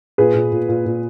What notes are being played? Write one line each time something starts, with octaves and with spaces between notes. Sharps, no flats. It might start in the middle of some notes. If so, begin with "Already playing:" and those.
A#2 G#4 B4
A#2
A#2
A#2
A#2